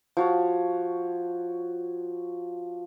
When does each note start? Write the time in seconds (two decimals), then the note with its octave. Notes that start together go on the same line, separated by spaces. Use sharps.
0.17 F3 F#4 C#5